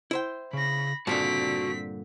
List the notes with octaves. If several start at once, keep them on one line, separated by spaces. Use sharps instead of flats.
E4 C5 G5
C#3 B5 A#6
G2 A#2 D3 C4 F#4 A5 B6